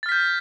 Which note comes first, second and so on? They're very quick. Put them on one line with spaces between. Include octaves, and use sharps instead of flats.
A6 F6 B6 G6